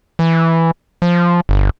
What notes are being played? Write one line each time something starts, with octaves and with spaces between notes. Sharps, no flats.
E3
F3
G1